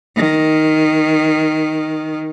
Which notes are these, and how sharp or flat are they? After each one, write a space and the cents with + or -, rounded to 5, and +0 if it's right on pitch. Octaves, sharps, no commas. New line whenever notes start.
D#3 +0